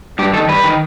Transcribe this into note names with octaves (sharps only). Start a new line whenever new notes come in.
G2 G4
D#3 A4
G2 B4
D#3